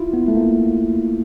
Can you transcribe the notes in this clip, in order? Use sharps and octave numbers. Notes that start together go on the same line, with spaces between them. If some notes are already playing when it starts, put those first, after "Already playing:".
Already playing: E4 F4
B3
A3
A#3